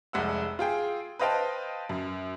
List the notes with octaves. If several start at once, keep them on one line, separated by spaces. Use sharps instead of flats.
F1 C2 G#3 F#5 E6
F4 G#4 G5
B4 C5 D#5 F5 G5 A5
F#2